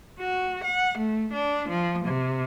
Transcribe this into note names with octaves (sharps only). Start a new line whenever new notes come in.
F#4
F#5
A3
D4
F3
C3